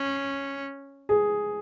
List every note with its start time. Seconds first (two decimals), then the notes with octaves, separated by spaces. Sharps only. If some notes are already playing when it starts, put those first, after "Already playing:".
Already playing: C#4
1.09 G#4